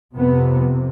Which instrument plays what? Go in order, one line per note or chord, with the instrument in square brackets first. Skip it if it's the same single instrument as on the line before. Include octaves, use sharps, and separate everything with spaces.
[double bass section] F2 C3 B3